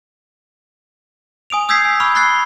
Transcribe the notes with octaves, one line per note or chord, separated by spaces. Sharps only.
G#5 D#6 D7 F7
D#6 E6 G6 G#6 B6 C7
G#5
B5 C#6 F6
B5 C#6 F#6 A6 C7 G7